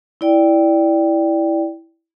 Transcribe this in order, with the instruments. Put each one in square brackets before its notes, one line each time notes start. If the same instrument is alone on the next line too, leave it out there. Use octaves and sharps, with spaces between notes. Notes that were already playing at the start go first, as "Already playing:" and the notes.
[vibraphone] E4 D5 G5